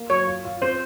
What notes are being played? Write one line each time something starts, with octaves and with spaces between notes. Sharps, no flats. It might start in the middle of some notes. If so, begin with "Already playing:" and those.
Already playing: A#3
F#3 C#5
F4
F4
C4 C5